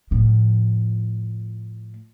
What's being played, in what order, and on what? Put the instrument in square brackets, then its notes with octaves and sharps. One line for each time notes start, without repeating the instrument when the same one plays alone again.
[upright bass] A2 F3